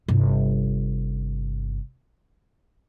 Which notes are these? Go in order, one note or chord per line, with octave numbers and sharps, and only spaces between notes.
G1 C3